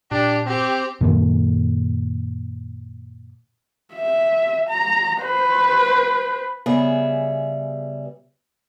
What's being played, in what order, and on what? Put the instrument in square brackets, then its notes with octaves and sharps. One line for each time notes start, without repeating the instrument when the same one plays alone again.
[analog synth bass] A#2 [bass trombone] D4 [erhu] G4
[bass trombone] C4 [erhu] G4
[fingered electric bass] F#2 A#2 D#3 A#3
[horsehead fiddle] E5
A#5
B4 C5
[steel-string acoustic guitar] C#3 G3 B3 G#4 E5